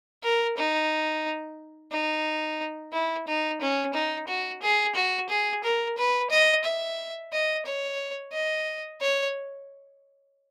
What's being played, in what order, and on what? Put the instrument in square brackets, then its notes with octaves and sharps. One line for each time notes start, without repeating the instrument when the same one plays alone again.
[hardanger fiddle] A#4
D#4
D#4
E4
D#4
C#4
D#4
F#4
G#4
F#4
G#4
A#4
B4
D#5
E5
D#5
C#5
D#5
C#5